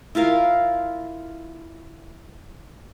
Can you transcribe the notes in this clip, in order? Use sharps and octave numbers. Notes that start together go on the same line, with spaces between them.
E4 F4 A#4 F5